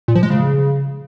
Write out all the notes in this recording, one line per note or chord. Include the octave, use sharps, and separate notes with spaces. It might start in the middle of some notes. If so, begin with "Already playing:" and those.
A#2
F3
G#3
C#3